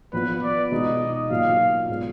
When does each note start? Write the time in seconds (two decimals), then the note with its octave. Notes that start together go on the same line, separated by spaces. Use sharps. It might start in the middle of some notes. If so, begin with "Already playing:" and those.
0.13 A#2 F3 B3 F4 B4
0.43 D5
0.71 B2 G#3 D#4 D#5
1.30 A#2 F#3 A#3 F4 F5
1.88 A#2 G#3 B3